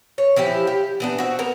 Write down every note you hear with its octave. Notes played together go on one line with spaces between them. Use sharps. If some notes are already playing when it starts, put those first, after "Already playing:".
C#5
E3 F3 E4 G4
G4
E3 B3 D4
C4 F#4
B3 A#4